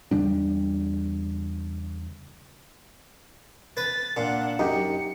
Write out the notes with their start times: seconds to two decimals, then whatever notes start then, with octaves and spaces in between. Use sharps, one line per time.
0.11 E2 C#3 G3 D4
3.77 B4 A6
4.17 A#2 D4 F#5
4.59 F#2 D#4 G4 C#7